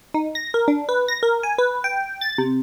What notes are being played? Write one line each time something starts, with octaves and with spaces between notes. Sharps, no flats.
D#4
A#6
A#4
D4
B4
A#6
A#4
G#5
B4
G5
A6
C3